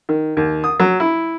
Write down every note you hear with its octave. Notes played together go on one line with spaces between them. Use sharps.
D#3
D#2
D#6
F#3
E4